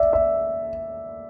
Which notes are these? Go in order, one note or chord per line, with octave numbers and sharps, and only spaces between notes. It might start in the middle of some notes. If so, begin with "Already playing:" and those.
Already playing: D5 E5
E5